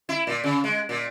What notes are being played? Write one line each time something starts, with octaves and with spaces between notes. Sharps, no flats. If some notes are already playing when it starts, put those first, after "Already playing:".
E4
A#2
C#3
G#3
A#2